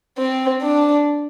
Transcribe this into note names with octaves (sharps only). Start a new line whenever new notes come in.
C4
D4